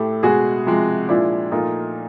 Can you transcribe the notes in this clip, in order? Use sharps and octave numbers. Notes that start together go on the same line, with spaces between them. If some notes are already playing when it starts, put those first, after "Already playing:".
Already playing: A2 G4 A4
B2 G#3 F#4 G#4
C3 F3 G#3
A#2 F3 G#3 D4 E4
A#2 F3 A3 D#4 F4